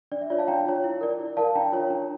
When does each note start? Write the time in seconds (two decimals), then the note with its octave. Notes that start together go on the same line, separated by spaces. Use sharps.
0.12 D4 D5
0.21 E5
0.30 F4 C#5 D5
0.38 F5 A5
0.48 D4 G5 A#5
0.65 F4 C#5
0.84 E4
1.01 A#4 D5
1.20 E4
1.37 A#4 D5 F5 A5
1.55 D4 G5 A#5
1.72 F4 C#5
1.90 D4